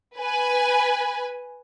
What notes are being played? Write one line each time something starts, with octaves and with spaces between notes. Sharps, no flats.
B4 G#5